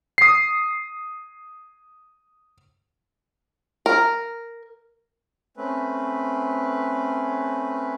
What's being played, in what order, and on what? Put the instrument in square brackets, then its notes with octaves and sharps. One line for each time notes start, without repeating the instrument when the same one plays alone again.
[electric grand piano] D#6 C7
[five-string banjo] A#4
[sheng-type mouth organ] A3 C4 C#4 B4